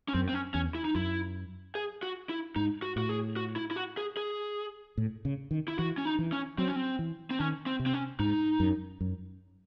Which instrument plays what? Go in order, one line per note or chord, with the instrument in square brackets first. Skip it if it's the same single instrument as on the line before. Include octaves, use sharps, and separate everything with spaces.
[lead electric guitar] C#4
[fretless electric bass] F#2 [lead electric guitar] C4
[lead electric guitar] C4
C#4
[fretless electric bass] E2 [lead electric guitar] C#4
[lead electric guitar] E4
D#4
[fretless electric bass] F#2 [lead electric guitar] E4
[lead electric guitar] G#4
F#4
E4
[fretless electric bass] G#2 [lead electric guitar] D#4
[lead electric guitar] F#4
[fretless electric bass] A2 [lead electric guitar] F#4
[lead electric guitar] G#4
F#4
E4
E4
F#4
G#4
G#4
[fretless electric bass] A2
C#3
D#3
[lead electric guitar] E4
[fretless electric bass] E3 [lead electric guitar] F#4
[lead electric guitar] C#4
D#4
[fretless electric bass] E3
[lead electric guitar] C#4
[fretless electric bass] F#3 [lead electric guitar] C4
[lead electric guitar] C#4
C4
[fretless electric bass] E3
[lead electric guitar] C4
[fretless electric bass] D#3 [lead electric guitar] C#4
[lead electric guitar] C4
[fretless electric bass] C3
[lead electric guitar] C4
C#4
[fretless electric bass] G#2 [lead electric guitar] D#4
[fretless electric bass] F#2
F#2